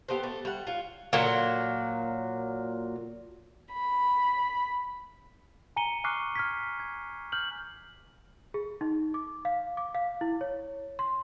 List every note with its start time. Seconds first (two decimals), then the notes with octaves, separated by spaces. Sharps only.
0.09 B3 G4 A4 C5
0.23 A3
0.45 G3 A3 F#5
0.67 F4 C#5
1.13 A#2 F#3
3.74 B5
5.76 G#5 A#5 C#7 D#7 G7
6.04 G#5 C#6 D6 F6 F#6 C7
6.36 F6 G#6 B6
6.80 G#6
7.32 F6 G6 F#7
8.54 G#4
8.81 D#4
9.14 D6
9.45 F5
9.77 D6
9.95 F5
10.21 E4
10.41 C#5
10.99 C6